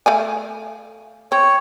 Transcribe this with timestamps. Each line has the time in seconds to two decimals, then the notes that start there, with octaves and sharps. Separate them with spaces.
0.06 A3 F5 G#5
1.32 C4 C#5